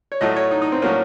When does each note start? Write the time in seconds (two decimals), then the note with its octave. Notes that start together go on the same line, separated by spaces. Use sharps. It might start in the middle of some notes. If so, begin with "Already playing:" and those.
0.12 C#5
0.21 A2 F#3 A3 D#5
0.36 C#5
0.51 D#4
0.62 D#4
0.72 C4
0.82 A2 F#3 A#3 C#4